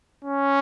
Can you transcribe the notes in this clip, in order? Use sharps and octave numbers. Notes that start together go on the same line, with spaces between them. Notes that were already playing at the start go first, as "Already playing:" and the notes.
C#4